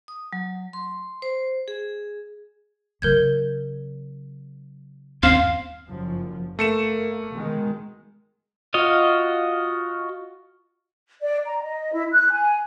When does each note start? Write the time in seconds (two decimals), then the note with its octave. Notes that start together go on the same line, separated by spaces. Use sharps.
0.08 D#6
0.33 F#3
0.73 C6
1.22 C5
1.68 G#4
3.02 C#3 F#3 A#4 G6 G#6
5.23 G1 D#2 C4 C#4 F5 C6 F6 E7
5.89 F#1 F#2 F3
6.59 A3 A#3 C#7 E7
7.31 B2 D#3 G#3
8.74 F4 F#4 D#5 F5
11.21 D5
11.45 A#5
11.62 D#5
11.92 E4
12.12 F#6
12.31 G#5